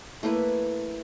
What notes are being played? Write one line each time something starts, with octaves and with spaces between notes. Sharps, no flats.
A3 A#3 E4 B4